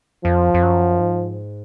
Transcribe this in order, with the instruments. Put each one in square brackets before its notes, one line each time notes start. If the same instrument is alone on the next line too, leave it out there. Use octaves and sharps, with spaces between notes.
[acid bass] F2 [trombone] F3
[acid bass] F2
F#2
G#2